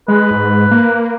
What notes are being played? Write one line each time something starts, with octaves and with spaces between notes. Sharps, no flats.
G#3 B4
G#2
A#3